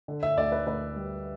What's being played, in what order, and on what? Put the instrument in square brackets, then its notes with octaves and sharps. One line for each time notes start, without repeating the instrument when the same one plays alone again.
[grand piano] D3
E5
D2 D5
B4
D2 B4
G3